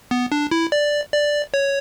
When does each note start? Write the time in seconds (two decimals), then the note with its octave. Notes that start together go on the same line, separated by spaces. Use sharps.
0.11 B3
0.32 D4
0.51 E4
0.72 D5
1.13 D5
1.54 C#5